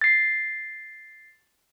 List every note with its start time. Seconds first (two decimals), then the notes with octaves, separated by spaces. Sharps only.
0.01 A6 C7